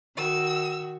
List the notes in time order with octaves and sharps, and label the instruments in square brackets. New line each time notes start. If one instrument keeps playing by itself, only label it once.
[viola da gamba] D#3 F#4 [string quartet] E6